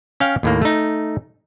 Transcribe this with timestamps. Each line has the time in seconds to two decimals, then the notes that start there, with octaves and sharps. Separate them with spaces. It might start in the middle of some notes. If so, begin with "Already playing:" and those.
0.20 C#4 F5 G5
0.43 D#2 A2 A#3
0.61 A3 D#4